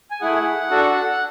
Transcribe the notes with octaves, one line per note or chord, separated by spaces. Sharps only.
G#5
A3 E4 G#4 F#5
D4 F#4 A4